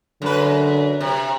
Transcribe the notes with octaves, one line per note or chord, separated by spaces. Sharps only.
F#2 D3 B4
C3